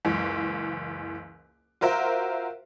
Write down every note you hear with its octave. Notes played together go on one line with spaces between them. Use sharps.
F#1 C#2 E3
F4 F#4 A#4 C5 E5